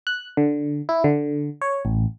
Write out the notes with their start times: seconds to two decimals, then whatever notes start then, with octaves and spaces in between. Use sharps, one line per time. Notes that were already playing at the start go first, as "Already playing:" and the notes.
0.07 F#6
0.37 D3
0.89 E4
1.04 D3
1.62 C#5
1.85 A1